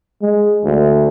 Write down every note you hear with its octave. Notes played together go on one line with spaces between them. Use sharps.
G#3
D2